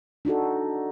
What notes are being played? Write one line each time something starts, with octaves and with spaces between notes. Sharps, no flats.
D4 D#4 F#4 A4